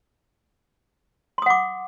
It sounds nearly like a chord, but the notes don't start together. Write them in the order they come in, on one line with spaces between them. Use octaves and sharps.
C6 D#6 F#5 D6